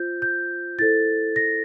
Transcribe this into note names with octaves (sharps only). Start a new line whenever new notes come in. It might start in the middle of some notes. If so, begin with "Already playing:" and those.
Already playing: F4 C5 G6
G6
E4 A4 C5 A6
A#6